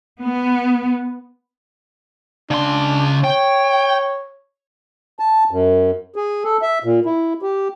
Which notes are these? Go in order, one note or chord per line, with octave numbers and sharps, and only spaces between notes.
B3
C#3 D4 C6
C#5 G5
A5
F#2
G#4
A4
E5
A#2
E4
G4